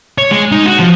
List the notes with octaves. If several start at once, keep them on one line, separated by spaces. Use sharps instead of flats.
C#5
G#3
D#4
F#4
F3